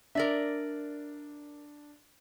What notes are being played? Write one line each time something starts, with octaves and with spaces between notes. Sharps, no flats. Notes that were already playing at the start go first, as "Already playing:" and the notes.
D4 A#4 D5 E5